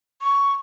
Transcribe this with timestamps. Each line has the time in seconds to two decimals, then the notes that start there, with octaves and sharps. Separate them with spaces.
0.21 C#6